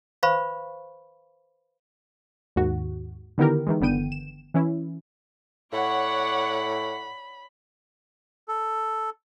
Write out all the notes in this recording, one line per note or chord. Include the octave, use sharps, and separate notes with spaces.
B4 C5 F5 B5 C#6
D#2 G#2 F#4
D3 D#3 B3 E4 G4 A#4
D#3 E3 G#3
G1 D3 B3 G5 D#7
E7
E3 C#4 E4
A2 C#5 D5 F#5 B5
A4